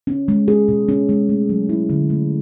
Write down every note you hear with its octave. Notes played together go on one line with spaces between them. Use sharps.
C#4
G#3
G#4
B2
C#4
G#3
A3
F#3
E4
D3
A3